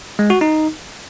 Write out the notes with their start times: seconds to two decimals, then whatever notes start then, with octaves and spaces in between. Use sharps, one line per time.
0.19 G#3
0.30 F#4
0.41 D#4